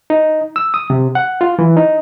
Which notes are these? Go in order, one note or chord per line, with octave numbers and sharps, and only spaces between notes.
D#4
E6
D#6
C3
F#5
F4
E3
D#4